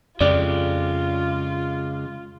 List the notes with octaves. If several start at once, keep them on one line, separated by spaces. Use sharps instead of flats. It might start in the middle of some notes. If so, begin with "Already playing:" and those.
F2 C#3 G#3 F4 G4 D5